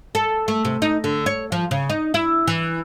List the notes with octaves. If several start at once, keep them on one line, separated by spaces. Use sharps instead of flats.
A4
A3
C3
D#4
D3
C#5
F3
C#3
D#4
E4
E3